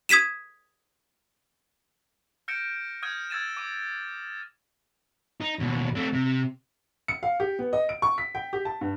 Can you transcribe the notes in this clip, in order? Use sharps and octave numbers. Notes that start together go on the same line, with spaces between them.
D#6 G#6 B6 D#7 E7
F6 G6 A#6 C#7 D7 E7
D#6 F6 G6 G#6 D#7
E6 G#6 A6 D#7 E7
D6 D#7
D#4
D#2 B2
A3 C4
C3
C#7
F5
G4
B3
D#5
D7
C#6
B6
G5
G4
A5
G2